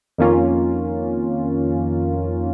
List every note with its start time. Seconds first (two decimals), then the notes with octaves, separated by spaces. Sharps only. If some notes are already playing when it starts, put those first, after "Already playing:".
0.18 F2 D#3 A#3 C#4 F4